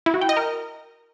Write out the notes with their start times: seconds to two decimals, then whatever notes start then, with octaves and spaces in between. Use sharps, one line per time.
0.06 E4
0.14 F#4
0.21 G5
0.29 D#5
0.37 A#4